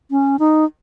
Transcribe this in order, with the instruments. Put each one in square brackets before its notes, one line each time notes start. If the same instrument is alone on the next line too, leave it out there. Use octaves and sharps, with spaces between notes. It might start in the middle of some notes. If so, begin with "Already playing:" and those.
[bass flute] C#4
D#4